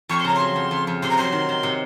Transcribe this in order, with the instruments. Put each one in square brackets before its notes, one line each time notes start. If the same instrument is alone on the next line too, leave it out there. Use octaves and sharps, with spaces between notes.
[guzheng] F2 [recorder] C#6
[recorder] C6
[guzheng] C#3 [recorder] A#5
[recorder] C6
[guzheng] F#3
F2
F2
F2
[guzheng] C3 [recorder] C6
[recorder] A#5
[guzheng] F#3 [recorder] C6
[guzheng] D#3
D#3
C3